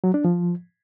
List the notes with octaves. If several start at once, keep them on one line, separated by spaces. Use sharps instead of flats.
F#3
D4
F3